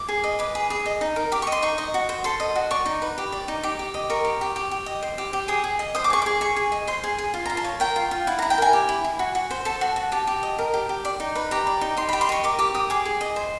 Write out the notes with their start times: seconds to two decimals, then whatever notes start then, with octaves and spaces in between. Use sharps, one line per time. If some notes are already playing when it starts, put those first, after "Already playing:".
Already playing: D6
0.08 G#4
0.24 D#5
0.39 B4 D6
0.55 G#4
0.70 G#4
0.86 D#5
1.01 D#4
1.16 A#4
1.32 G4 D6
1.42 C#6
1.47 D#5
1.52 C6
1.63 D#4 C#6
1.78 D#5
1.94 F#4
2.09 C5
2.24 A4 C6
2.40 D#5
2.56 F#4
2.71 D5 C#6
2.86 D#4
3.02 B4
3.18 G4
3.32 D5
3.48 D#4
3.63 G4 D6
3.79 G4
3.94 D#5
4.10 A#4 C#6
4.25 G4
4.41 G4
4.56 G4
4.71 G4
4.86 D#5
5.02 C5
5.18 G4
5.33 G4
5.48 G#4 D#6
5.64 G#4
5.79 D#5
5.95 C5 D#6
6.04 D6
6.10 G#4 C#6
6.22 G#4 D6
6.41 G#4 C#6
6.56 G#4
6.72 D#5
6.87 C5 C6
7.04 G#4
7.18 G#4
7.34 F4
7.46 F4 A#5
7.57 A5
7.64 C#5
7.80 A#4 G5
7.96 F4
8.11 F4
8.27 E4 F#5
8.39 E4 A#5
8.50 G5
8.58 A#4 G#5
8.73 G4
8.89 E4
9.04 E4
9.19 F#4
9.35 F#4
9.51 C5
9.65 A4 A5
9.81 F#4
9.96 F#4
10.12 G4 A5
10.27 G4
10.43 D#5
10.58 A#4
10.74 G4
10.89 G4
11.05 D5
11.20 D#4
11.35 B4
11.51 G4 A#5
11.67 D5
11.81 D#4
11.97 G4 C6
12.09 G4 B5
12.21 C6
12.29 D#5 C#6
12.44 A#4 D6
12.59 G4 D6
12.74 G4 D#6
12.90 G#4 D6
13.05 G#4
13.21 D#5
13.36 C5